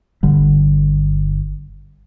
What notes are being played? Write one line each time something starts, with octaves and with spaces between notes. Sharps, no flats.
G1 D3 G3